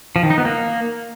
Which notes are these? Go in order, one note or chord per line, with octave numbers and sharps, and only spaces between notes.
F3
D#3
D#4
B3
A#3